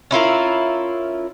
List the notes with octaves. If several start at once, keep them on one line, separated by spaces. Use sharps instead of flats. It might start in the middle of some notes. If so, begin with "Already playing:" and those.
C#4 E4 F4 A#4